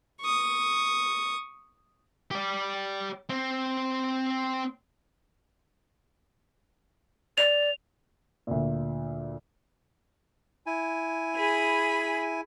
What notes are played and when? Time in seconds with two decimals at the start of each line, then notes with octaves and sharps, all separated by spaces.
0.21 C#6 D#6
2.31 G4 D5
3.29 C4
7.38 D5 F7
8.47 D2 A#2
10.66 E4 G#5
11.35 G#4 B5